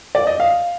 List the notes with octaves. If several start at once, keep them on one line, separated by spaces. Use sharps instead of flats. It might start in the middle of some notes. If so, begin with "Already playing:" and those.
D5
D#5
F5